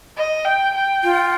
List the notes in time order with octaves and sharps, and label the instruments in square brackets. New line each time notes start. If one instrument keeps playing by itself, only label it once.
[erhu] D#5
G5
G5
[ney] F4